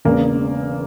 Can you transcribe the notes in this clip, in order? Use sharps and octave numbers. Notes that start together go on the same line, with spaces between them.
E1 E2 C#3 G#3 A#3